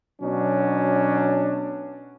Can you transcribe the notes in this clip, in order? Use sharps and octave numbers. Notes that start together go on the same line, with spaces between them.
B2 F#3 C#4 D4